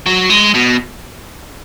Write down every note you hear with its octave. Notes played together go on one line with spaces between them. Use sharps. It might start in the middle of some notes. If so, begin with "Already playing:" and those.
F#3
G#3
B2